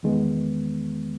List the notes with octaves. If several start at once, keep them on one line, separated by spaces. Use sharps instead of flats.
E2 D#3 G#3 B3